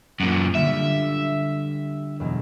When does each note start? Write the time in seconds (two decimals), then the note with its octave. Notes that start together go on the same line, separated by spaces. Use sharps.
0.20 F#2 A#2 F#6
0.55 D3 G3 F4 E5
2.20 E2 B2 F#3